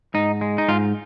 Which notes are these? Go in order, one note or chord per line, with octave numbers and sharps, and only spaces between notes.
G#2 D#4
G#3
D#4
G#2 F4